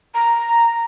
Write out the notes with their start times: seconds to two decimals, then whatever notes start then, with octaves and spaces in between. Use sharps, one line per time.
0.15 A#5